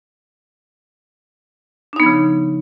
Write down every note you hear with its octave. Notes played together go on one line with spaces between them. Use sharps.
C#3 F3 B3 D4 D#4